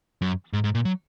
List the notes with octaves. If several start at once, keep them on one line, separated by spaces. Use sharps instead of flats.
F#2
G#2
G#2
A#2
F#3